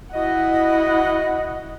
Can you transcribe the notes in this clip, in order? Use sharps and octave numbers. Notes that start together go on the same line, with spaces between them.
E4 F#4 D#5 F#5